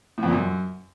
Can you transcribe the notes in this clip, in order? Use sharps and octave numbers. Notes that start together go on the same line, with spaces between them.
A2
F2
A#2
F#2